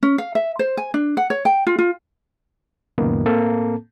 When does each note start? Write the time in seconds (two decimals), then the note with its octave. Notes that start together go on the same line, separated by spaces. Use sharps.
0.03 C#4
0.18 F5
0.35 E5
0.59 C5
0.77 G#5
0.94 D4
1.17 F#5
1.30 C#5
1.45 G5
1.67 F4
1.79 F4
2.98 C#2 F#2 A#2 D#3 A#3 B3
3.25 A2 A#3 C4 A4 A5